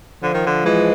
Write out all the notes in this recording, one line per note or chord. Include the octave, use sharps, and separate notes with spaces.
D3 F3
D#3
D3
E3 G#3